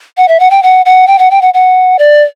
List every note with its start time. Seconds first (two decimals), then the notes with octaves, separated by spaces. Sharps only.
0.17 F#5
0.28 E5
0.40 F#5
0.51 G5
0.63 F#5
0.86 F#5
1.07 G5
1.19 F#5
1.31 G5
1.42 F#5
1.54 F#5
1.99 D5